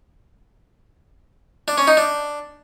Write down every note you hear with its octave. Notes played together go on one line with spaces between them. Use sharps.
D4
C#4
D#4
D4